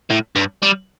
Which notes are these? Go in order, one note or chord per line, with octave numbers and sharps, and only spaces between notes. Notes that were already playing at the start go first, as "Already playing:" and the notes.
A2
G2
G3